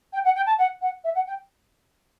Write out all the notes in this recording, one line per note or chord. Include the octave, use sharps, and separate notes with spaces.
G5
F#5
G5
A5
F#5
F#5
E5
F#5
G5